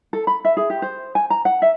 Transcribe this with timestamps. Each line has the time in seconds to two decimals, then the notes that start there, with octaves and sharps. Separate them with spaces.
0.13 A4
0.27 B5
0.45 E5
0.57 G#4
0.70 G4
0.82 C5
1.15 G#5
1.30 A#5
1.45 F#5
1.62 E5